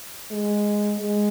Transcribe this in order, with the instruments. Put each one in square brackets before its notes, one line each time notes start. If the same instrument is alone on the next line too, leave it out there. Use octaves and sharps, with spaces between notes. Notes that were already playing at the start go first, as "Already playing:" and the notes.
[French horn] G#3
G#3